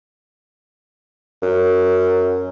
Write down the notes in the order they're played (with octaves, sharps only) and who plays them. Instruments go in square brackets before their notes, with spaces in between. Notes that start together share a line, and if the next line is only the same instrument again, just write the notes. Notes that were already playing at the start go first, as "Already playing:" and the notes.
[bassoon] F#2